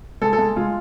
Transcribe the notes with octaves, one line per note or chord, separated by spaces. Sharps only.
G#3 A4
A4
G#3
G#3 F4